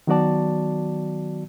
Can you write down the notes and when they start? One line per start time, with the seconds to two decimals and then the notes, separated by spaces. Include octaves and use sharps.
0.07 D#3 F#3 B3 F#4 D5 A5